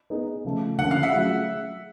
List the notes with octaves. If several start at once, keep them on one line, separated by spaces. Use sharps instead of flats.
B3 D#4 G#4
C#3 F3 A3
D3 F3 A#3 C#4 F#5
F5
E5 F#5
F#3 A3 C#4 F4 G#4